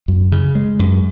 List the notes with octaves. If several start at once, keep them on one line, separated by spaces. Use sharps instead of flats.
F#2
C#3
G#3
F#2